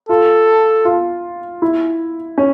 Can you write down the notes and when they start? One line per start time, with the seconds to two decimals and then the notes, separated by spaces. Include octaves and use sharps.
0.09 F4 A4
0.85 F4
1.62 E4
2.38 C#4